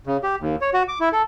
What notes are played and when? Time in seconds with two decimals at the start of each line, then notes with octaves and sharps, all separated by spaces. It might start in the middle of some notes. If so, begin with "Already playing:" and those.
0.07 C#3
0.23 G4
0.40 D#2
0.61 C#5
0.73 F#4
0.88 D6
1.00 E4
1.13 A4